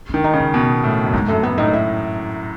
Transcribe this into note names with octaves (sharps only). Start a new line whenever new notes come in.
D#3 C#4
D#4
C#3
D#4
B2 B3
A2
F#2
G#2 G#3
F#2 A3
B3
A2 D#4
E4